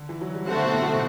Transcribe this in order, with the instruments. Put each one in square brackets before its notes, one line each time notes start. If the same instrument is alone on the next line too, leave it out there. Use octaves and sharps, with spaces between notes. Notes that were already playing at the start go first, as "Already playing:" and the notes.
Already playing: [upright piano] D3
E3
F#3
G3
[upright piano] F#3 [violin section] A3 C4 F#4 C5 F#5
[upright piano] D3
B2
A2
B2